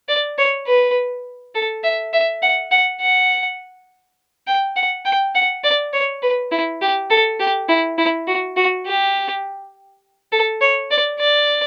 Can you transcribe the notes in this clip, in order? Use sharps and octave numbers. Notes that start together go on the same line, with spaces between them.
D5
C#5
B4
A4
E5
E5
F#5
F#5
F#5
G5
F#5
G5
F#5
D5
C#5
B4
E4
G4
A4
G4
E4
E4
F#4
F#4
G4
A4
C#5
D5
D5